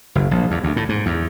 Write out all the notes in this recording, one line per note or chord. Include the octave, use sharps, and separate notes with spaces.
F#1
A#1
E2
D2
A2
G#2
E2